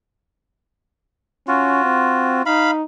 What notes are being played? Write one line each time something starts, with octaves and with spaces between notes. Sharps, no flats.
C#4 F4 F#4
C4
D#4 F5 B5